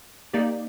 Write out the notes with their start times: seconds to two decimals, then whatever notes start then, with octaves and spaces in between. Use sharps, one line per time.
0.34 A#3 D#4 G4 D5